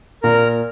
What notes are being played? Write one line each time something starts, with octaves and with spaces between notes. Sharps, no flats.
A#2 A#4 A#5